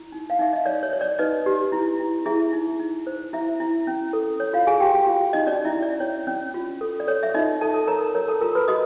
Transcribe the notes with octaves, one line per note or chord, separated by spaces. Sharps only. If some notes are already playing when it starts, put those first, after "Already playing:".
Already playing: E4
D#4
F5
D#4 E5
D#5
C#5 D5
C#5
C#5
D5
D#4 B4 D#5
G4
E4
E4
E4 G#4 E5
D#4
D#4
C5
E4 E5
E4
C#4
A4
C#5
F4 F5
F#4 G#4 G#5
G4 G5
F#4 G4 G5
F4 F5
F#4
D#4 D#5
C#4 D5
E4 E5
C#4
D5
C#4 C#5
C#4
F4
A4
D5
A4 C#5
E5
D#4 F4 D#5
A4 A5
A4 A5
A#4 C#5 A#5
A#4 A#5
A#4 C#5 A#5
A4 A5
F4 A#4 A#5
B4 B5
F#4 D#5 D#6